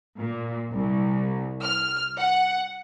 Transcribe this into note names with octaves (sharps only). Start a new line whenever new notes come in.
A#2
C2
F6
F#5